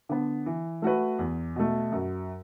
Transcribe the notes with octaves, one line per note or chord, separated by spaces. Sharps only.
D3 B3
E3
A3 F#4 B4
E2
B2 A3
F#2